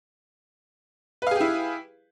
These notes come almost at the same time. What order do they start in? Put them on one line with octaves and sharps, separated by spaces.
B4 F5 G#4 G4 E4